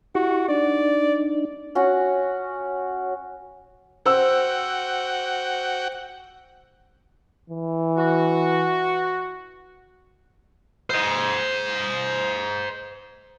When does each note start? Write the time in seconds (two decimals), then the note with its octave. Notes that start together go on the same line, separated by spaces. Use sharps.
0.15 E4 F#4 G4 C#6
0.49 D4 D#4 D5
1.75 C#4 F#4 F#5
4.06 F#4 C5 F#5 G5 E6
7.50 E3
7.97 F#4
10.90 C5 D#5